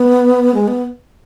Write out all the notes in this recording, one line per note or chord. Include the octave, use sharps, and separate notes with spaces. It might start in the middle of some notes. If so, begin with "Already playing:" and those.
Already playing: B3
G#3
B3